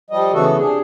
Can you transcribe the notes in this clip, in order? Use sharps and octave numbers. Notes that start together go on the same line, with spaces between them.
F3 G3 D#5
C#3 E3 A3 B3 F#4 A4
C3 F3 D4 G#4